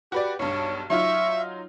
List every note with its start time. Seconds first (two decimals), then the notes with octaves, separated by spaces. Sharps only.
0.12 F#4 G4 B4 D5
0.39 B1 G2 C#5
0.90 F#3 D#4 F4 E5 C#6